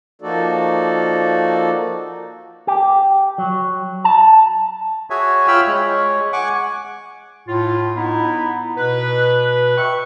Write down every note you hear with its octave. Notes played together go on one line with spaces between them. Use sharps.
F3 A#3 D#4 F#4 A4 D5
G4
F#3
A5
F#4 G#4 C#5 E5 G#5
F4 C#5 G5 B5 E6 F6
G#3 C#5
F#5 G#5 C#6 D6
A2 F4
B3 D#4 E4
B2 B4
E5 G5 C#6